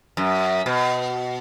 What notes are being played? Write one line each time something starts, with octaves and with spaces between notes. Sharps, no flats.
F#2
B2